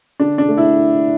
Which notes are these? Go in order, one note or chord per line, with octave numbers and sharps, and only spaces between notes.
D3 D4
D4
A3
E4